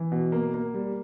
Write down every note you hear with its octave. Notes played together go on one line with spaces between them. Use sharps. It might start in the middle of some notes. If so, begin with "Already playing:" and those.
Already playing: E3
B2
A#3
A#3
G3